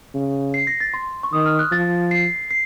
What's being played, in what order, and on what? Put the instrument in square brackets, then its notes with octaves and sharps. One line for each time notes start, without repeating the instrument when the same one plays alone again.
[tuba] C#3
[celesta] C7
A#6
A6
C6
C#6
[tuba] D#3 [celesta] D#6
[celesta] F6
F#6
[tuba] F3 [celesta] A6
[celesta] C7
C7